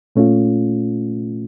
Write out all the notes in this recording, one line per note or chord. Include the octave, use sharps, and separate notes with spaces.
A#2 A3 C#4 F4